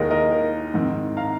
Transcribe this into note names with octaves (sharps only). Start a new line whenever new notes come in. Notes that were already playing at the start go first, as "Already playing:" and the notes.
Already playing: D#2 D#3 G#3 A#4 D#5
A#4 D#5
A#4
G#2 D#3 C4
F5 A#5